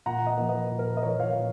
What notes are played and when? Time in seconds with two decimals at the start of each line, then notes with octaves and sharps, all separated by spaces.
0.06 A#2 F#5 A#5
0.27 D#5 F#5
0.37 F3 A#3
0.49 B4 D#5
0.71 A#2
0.79 A#4
0.87 B4
0.97 D#5
1.03 F3 A#3 A#4 C#5
1.20 C#5 F5
1.35 A#2